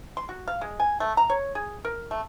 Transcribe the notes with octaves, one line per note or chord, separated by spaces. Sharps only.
C6
F#4
F5
G#3
G#5
A3
A#5
C#5
G#4
A#4
A3